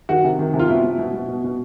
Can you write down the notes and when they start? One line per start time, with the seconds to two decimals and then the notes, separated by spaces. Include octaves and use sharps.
0.09 D#3 F#4
0.24 C3
0.39 D#3
0.54 C3
0.59 F4
0.69 B2 E4
0.84 B2
0.99 B2
1.14 B2
1.28 B2
1.44 B2